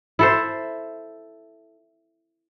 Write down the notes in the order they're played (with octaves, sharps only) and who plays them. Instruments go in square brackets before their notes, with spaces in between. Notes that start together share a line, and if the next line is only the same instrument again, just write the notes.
[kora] E4 A4 C5